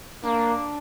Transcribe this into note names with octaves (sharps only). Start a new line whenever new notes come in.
A#3 D4